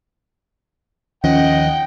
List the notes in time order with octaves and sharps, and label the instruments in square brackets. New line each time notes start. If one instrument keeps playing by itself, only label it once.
[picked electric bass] D#2 D#3 F3 [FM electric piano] C#4 [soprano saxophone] D#5 [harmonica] F#5 G5